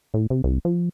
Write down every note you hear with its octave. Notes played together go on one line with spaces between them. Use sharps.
A2
C3
C2
F3